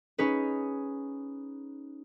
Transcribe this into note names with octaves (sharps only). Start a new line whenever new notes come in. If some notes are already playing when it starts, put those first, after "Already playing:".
C#4 D#4 G#4 B4